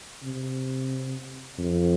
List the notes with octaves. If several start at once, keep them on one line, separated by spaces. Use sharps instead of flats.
C3
F2